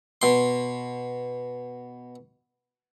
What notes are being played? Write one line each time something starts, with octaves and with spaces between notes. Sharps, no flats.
B2 C6